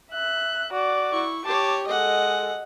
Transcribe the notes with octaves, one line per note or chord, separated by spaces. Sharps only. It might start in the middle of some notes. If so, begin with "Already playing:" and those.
E5 F#6
F#4 D5
E4 C#6
G4 C#5 A5 D6
G#3 A4 D#5 F#5